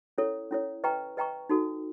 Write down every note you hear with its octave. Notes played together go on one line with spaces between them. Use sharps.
C#4 E4 A4 C#5
C#4 E4 A4 C#5
B4 D#5 G5 A#5 C#6
B4 D#5 G5 A#5 C#6
D#4 F#4 A4